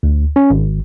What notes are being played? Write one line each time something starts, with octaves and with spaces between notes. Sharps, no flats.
D2
C#4
G#1